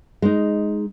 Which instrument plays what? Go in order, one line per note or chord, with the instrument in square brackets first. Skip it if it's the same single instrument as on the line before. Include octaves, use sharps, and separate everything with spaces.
[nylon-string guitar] G#3 D#4